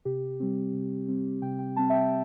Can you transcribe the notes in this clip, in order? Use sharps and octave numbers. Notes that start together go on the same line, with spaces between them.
C3 G4
G3 C4
C3
G3 C4
C3 G5
G5
G3 C4 A5
E5
G5